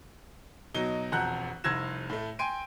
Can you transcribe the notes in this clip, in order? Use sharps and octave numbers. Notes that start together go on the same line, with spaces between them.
B2 F#3 D#4 G7
E1 F2 F#5 A#5 F#6 G6
F1 C2 E6 G#6 A#6 E7
A2 A3
G5 G#5 C6 D7 D#7